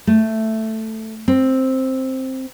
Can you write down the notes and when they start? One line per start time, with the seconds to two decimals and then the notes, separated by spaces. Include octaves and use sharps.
0.07 A3
1.28 C4